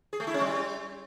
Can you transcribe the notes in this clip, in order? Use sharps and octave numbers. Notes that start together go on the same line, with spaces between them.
G#4
A3
E4
C#4
G3